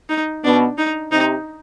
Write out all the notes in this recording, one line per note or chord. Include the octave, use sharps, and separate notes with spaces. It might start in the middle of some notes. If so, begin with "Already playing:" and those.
D#4
B2 D4
D#4
C3 D#4